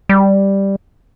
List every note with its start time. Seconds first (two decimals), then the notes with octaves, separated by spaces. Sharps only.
0.09 G3